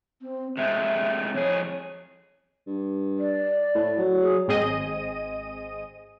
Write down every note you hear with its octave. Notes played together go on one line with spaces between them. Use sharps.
C4
C3 G#3 A3 E5
F2 G#4 C#5
G2
D5
A2
F#3
G#4
G#1 C4 G#4 D#5 D#7